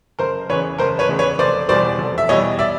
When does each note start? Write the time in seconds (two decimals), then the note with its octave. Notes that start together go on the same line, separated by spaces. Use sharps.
0.19 F#1 A#4 C5
0.49 E2 C#3 E3 B4 C#5
0.79 F#1 A#4 C5
0.99 B4 C#5
1.09 E2 C#3 E3
1.19 B4 C#5
1.38 F1 C5 D5
1.68 E2 B2 G3 C5 D5
1.98 F1
2.18 E5
2.29 E2 B2 G3 C#5 D#5
2.59 D5 E5